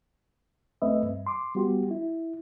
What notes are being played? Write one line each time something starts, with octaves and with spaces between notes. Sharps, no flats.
C#2 A3 C4 B4 D#5 E5
G2
C6 D6
G3 B3 F#4 G4
E4